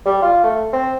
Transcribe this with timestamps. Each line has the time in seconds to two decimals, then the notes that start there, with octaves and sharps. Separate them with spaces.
0.05 G3
0.22 F4
0.43 A3
0.73 C4